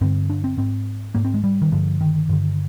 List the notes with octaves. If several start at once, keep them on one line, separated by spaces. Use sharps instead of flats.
G2 D3 C4
D4
C4
G#2 C4
G#2 A#3
C4
G#3
G3
D#3
G2 D3 F3
D#3
G2 D3